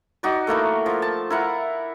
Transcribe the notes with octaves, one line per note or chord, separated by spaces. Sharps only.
D#4 F#4 D5
A3 A#3 E4 A#4
F3
A5
E4 A#4 F#5